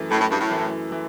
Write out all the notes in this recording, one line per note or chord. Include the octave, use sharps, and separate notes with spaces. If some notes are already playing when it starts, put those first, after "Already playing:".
Already playing: F#2 E3 A3
F#2 A2 E3 A3
A2
G2
A2
F#2 E3 A3
E3 A3